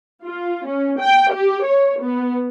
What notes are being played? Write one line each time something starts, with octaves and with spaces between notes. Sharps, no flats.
F4
C#4
G5
G4
C#5
B3